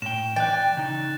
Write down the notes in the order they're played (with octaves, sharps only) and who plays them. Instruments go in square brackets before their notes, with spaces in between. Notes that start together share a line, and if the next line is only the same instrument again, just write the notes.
[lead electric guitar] A2 G5 [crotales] E7
[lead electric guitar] E3 D5 [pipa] G5 [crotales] F#6 A6
[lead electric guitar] C#3 D#4